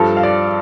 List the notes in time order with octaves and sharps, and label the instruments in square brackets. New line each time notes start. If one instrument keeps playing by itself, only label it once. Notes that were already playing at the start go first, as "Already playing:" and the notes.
Already playing: [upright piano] G2 F3 A4
F5
D5